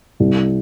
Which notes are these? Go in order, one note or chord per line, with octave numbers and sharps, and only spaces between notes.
C2